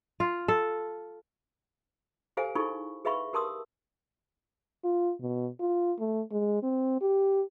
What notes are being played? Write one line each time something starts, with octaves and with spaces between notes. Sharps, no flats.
F4
A4
G4 A4 C5 F5 G#5
D#4 E4 G#4 A4 B5 C#6
G#4 B4 E5 F5 B5 C#6
G4 A#4 A5 C6 D#6 E6
F4
B2
F4
A3
G#3
C4
G4